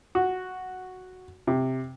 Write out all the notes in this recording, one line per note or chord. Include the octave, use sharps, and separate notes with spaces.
F#4
C3